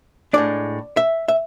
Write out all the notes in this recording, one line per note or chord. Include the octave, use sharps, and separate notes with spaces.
A2 G#3 D4 D5
E5
E5